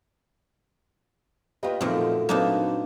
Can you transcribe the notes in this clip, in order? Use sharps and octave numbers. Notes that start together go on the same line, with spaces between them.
A#3 D4 F4 G4 B4 D#5
F#2 A#2 D3 D#3 F3 A3 C4 D#4
F#3 A#3 C4 D4 D#4 B4